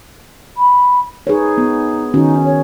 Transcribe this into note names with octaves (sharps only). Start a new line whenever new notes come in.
B5
D#4 G#4 B4 C#5
B3
D#3 C#4 D#4 F#4
C#5